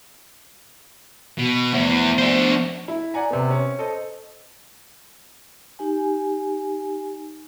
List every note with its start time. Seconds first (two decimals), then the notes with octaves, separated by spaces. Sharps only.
1.39 B2
1.74 E2 F3 A3 B3
2.18 D4 C5
2.88 E4
3.14 D5 F#5 G#5 A#5
3.31 C3 B3
3.50 C#4
3.79 A4 C5 D#5
5.79 D#4 G4 G#5